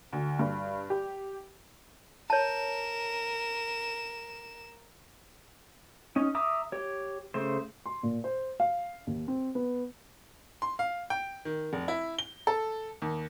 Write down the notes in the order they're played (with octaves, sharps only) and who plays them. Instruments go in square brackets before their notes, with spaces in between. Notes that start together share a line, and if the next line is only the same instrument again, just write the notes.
[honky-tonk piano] D2
G2
G4
[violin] A#4 E7 [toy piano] C#5 A5
[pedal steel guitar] C#4 D#4
E5 A#5 D6 D#6
G4 C#5
C#3 A3 C5
[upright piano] C6
A#2
C5
F5
D#2
C4
B3
[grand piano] C6
F5
G5
D#3
F1
E4
G7
A4
D#2